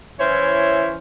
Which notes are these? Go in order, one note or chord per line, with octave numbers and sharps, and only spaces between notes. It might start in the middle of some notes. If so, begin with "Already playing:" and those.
E3 C#4 E4 C5 C#5